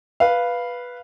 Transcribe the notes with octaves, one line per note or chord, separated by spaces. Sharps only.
B4 F5